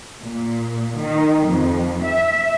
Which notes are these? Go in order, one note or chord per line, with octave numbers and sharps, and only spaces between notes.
A#2
D#3
F2
E5